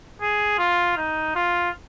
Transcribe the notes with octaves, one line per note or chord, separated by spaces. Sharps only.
G#4
F4
D#4
F4